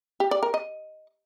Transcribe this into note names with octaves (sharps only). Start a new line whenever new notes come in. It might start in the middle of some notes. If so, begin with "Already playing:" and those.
G4
D5
A#4
D#5